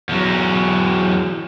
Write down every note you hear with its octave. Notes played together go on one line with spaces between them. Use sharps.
E2 F#3